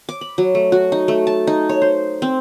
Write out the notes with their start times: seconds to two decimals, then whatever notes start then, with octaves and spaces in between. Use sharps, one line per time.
0.09 D6
0.21 B5
0.38 F#3
0.55 A3
0.72 F#4
0.92 D#4
1.08 A3
1.27 A5
1.47 D#4
1.69 C#5
1.82 C5
2.22 C4